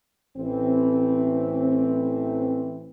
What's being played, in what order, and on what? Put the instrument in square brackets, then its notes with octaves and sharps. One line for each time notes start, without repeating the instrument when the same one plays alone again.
[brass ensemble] A1 E3 A3 C4